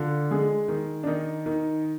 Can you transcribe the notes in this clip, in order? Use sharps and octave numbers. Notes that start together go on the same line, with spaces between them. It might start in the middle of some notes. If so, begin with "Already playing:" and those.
Already playing: D3 F4
G#3 G#4
D#3
D4
D#3 D#4
D#3